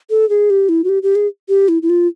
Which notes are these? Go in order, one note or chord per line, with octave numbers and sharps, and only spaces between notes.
A4
G#4
G4
E4
F#4
G4
G4
G#4
G4
E4
E4
F4